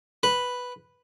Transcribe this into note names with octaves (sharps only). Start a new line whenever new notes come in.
B4